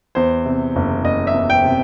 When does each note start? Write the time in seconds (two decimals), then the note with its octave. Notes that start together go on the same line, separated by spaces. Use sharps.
0.15 E2 C5
0.46 C3
0.76 F#1
1.04 F#1 D#5
1.27 E5
1.34 E2
1.50 G5
1.65 C3